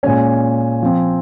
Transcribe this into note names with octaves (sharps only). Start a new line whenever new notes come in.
A#2 G#3 C#4 G#5
F3 C4